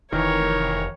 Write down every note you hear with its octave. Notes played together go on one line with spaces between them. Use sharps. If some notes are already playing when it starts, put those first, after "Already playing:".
F1 D#3 E3 A#4 C#5